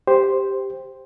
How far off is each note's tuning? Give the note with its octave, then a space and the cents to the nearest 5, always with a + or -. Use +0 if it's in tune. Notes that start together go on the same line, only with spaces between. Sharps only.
G4 +5 C5 +0